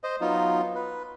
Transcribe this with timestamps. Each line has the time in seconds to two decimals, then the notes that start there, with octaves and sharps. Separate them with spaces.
0.04 C5 D#5
0.21 F#3 B3 D#4 F4
0.75 B4